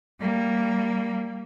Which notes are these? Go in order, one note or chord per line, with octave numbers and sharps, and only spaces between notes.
G3 A#3